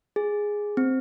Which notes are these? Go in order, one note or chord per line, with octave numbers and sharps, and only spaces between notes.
G#4
C4